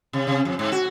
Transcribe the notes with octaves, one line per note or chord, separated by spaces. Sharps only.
C3
C3
F2
G#2
F#4